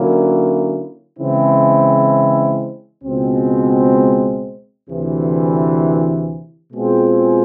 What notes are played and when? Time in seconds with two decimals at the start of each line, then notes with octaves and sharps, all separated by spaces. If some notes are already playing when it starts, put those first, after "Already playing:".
Already playing: D3 F#3 A#3 C#4 E4
1.18 C#3 E3 G#3 C4 E4
3.03 C#2 B2 G#3 C4
4.89 D2 C3 E3
6.73 B2 G#3 C4 F4 G#4